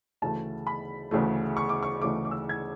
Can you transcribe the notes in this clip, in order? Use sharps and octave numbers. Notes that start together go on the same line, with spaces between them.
D2 C#3 E3 A3 A5
B5
D2 C#3 E3 A3
C#6
D6
C#6
D2 C#3 E3 A3 D6
D6
E6
G#6